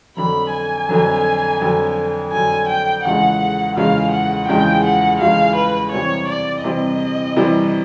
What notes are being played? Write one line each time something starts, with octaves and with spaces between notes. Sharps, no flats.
F2 D3 F#3 B5
G#5
F2 D3 F#3
F2 D3 F#3
F2 D3 F#3 G#5
G5
E2 C#3 F3 G#3 F#5
E2 C#3 F3 G#3 F5
F#5
E2 C#3 F3 G#3 G5
F#5
E2 C#3 F3 G#3 F5
B4
C3 E3 G3 C4 C#5
D5
C3 E3 G3 C4 D#5
C3 E3 G3 C4